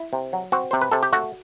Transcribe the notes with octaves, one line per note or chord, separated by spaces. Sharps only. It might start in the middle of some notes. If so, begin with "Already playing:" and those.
Already playing: E4
C3
F#3
C4 F#4
C3 C5
B4
C3 A4
G4
A3 F#4